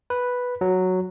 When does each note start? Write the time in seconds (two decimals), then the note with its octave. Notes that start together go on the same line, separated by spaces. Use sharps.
0.10 B4
0.61 F#3